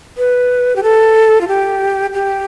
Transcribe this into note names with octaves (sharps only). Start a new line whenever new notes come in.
B4
G4
A4
F4
G4
G4